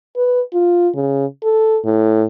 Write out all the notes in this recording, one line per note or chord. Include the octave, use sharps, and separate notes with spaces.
B4
F4
C#3
A4
A2